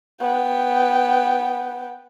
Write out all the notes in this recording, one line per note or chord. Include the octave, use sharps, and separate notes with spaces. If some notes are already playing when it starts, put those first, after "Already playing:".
B3 G5